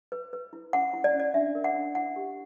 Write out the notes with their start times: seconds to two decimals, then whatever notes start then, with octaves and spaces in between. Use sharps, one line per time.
0.12 B4
0.33 B4
0.53 E4
0.73 C#4 F#5
0.93 E4
1.04 D5
1.14 C#4
1.20 D5
1.34 D4 E5
1.55 A#4
1.64 F#5
1.75 D4
1.95 E4 F#5
2.16 G4